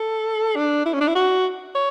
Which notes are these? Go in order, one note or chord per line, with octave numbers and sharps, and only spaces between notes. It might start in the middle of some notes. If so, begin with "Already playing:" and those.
Already playing: A4
D4
E4
C#4
D4
E4
F#4
C#5